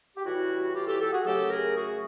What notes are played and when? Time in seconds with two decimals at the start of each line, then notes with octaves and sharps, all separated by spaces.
0.16 G4
0.25 A2 E3 G3 E4 F#4
0.75 F4 G4
0.87 G4 A4
1.01 G4 A4
1.12 F#4 G#4
1.25 F#2 C#3 F#3 A3 G4 A4
1.50 G#4 A#4
1.76 F#4 G#4